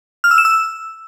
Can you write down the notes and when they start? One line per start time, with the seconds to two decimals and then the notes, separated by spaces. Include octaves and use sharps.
0.24 F6
0.31 E6
0.38 E7
0.45 E6